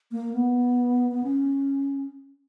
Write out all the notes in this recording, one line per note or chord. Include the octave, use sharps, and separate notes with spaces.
A#3
B3
B3
C#4